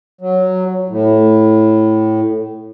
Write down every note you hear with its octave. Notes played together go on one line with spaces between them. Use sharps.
F#3
A2